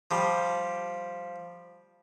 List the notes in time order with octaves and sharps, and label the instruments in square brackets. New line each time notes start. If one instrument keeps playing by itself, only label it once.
[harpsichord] F3 G3